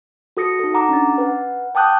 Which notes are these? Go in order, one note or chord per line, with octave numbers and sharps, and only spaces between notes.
F#4 A4 D#6 A#6 C#7
D#4 A4
F#5 A#5 D6
C#4 D4 A6
B4 F#5
G5 A5 D6 D#6 F#6 G6